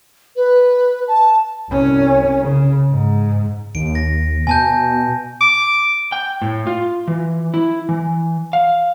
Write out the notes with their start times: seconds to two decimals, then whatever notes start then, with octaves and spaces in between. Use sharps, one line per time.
0.36 B4
1.08 A5
1.70 C2 C#4
2.41 C#3
2.89 G#2
3.75 D#2 D7
3.95 A#6
4.47 B2 G#5 A5 G6
5.41 D6
6.12 G5
6.42 A2
6.67 F4
7.07 E3
7.54 E4
7.89 E3
8.53 F5